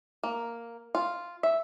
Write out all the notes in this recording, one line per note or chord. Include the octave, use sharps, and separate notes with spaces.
A#3
F4
E5